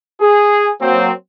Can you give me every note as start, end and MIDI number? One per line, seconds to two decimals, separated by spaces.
0.21 0.70 68
0.81 1.11 54
0.81 1.11 58
0.81 1.11 60